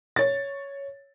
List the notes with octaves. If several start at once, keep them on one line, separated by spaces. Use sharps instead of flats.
C#5 A6